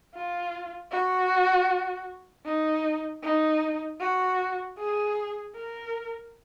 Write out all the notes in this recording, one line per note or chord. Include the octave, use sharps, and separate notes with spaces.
F4
F#4
D#4
D#4
F#4
G#4
A#4